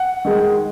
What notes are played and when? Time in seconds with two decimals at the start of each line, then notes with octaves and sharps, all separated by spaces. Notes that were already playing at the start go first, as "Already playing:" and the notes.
Already playing: F#5
0.25 D#3 G#3